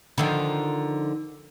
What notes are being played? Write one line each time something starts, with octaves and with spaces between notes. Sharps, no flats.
D3 D#3 F3